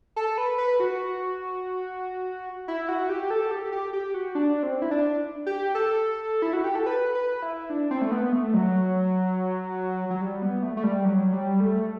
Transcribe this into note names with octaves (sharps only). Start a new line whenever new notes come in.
A4
B4
B4
F#4
E4
F#4
G4
A4
G4
G4
G4
F#4
D4
C4
E4
D4
G4
A4
E4
F#4
G4
A4
B4
B4
E4
D4
C4
A3
B3
A3
F#3
F#3
G3
B3
A3
A3
G3
F#3
G3
A3